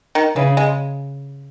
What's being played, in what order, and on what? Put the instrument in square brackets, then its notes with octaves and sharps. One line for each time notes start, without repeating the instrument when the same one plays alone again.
[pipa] D#3
[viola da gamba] C#3 [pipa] E3
[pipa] G#3